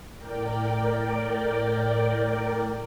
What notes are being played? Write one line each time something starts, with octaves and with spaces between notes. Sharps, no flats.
A2 A#4 D5 G5